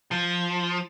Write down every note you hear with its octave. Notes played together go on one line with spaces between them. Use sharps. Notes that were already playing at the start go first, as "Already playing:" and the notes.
F3